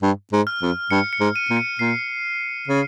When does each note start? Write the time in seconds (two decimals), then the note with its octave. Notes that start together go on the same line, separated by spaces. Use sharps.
0.02 G2
0.32 G#2
0.47 F6
0.62 F2
0.90 G2 C#7
1.13 C#7
1.20 G#2
1.36 D#7
1.50 A#2
1.57 C#7
1.79 A#2 C7
2.68 C#3